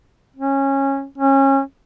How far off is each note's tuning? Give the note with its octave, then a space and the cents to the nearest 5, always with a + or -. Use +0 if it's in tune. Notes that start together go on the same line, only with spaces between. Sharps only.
C#4 -20
C#4 -25